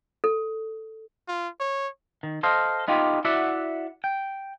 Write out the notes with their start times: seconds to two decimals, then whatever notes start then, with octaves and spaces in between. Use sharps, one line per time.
0.24 A4
1.28 F4
1.60 C#5
2.23 D#3
2.43 A4 C5 D#5 F5
2.88 B3 D#4 F4 G4
3.25 E4 F#4 D5 E5 F#5
4.04 G5